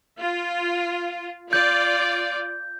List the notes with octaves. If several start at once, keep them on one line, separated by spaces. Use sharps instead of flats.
F4
F4 D5 G6